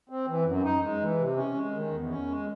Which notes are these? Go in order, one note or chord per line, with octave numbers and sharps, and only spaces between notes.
C4
E3
F#2
D#4
G#3
E3
C3
C#4
G#3
D#3
E2
C#4
G#3